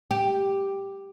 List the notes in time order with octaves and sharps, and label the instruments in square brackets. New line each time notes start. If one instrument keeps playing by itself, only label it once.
[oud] G4